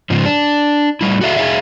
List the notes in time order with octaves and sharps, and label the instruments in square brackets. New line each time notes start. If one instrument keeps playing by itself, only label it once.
[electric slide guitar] G#2 C#3 F3
D4
A2 G3 E4
F#4 A4 E5 F5
E4 G#4 E5 F5